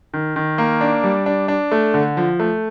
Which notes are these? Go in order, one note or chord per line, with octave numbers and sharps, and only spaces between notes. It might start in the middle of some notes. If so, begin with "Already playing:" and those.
D#3
D#3
A#3
D4
G3
D4
D4
A3
D3
F3
A3